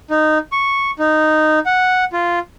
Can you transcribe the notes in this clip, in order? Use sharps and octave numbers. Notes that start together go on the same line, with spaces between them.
D#4
C#6
D#4
F#5
F4